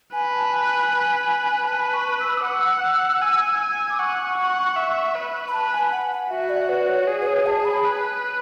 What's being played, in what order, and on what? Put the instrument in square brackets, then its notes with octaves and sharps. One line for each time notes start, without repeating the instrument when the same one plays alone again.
[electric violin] B4 [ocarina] G#5
[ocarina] A5
G#5
G#5
[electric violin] B4 [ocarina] A5
[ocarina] C#6
E6
D6
[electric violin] F#5 [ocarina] E6
[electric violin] G#5
[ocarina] D6
[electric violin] F#5 [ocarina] C#6
[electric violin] F#5
E5
B4
[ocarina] B5
[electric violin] B4 [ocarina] A5
[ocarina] G#5
F#5
F#5
[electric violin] F#4 [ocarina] E5
[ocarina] D5
B4
C#5
[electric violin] G#4
[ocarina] B4
C#5
A5
B5
[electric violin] B4